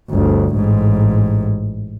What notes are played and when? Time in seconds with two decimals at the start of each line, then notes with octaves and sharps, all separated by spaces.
0.10 G1 D2
0.56 A1 G#2